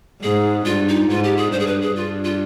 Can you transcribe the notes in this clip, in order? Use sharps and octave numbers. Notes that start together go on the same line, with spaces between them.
G#2 G#4
G2 F4
D#4
G#2 F4
G4
G#4
G2 C5
G#4
B4
G#4
G2 F4
F4